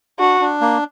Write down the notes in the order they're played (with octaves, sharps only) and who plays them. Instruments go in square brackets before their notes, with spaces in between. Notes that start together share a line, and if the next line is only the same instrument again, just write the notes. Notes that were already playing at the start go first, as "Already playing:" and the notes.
[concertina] D4 [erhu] F#4
[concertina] D4
A#3